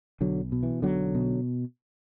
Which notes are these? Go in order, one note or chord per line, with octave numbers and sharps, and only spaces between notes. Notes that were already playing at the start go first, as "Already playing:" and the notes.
B1 D3 F#3
B2
E3
B1 D3 F#3
B2